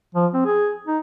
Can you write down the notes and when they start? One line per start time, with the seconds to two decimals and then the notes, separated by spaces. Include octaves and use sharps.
0.15 F3
0.34 C4
0.46 G#4
0.87 D#4